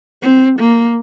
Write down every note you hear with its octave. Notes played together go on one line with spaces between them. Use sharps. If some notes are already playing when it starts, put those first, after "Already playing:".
C4
A#3